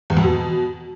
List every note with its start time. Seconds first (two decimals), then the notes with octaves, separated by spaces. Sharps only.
0.10 E2
0.17 F2
0.24 B2